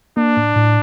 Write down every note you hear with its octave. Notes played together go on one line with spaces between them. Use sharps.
A#3 D4
A2
A2